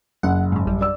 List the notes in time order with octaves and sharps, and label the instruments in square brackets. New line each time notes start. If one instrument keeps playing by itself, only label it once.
[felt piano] F#1 [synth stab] F#5
[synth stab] G#2 C#3
A1 G3
[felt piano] D5 E6